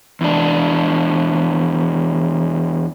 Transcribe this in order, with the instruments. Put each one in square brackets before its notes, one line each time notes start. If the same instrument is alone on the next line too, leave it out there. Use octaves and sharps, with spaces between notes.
[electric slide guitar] E2 D4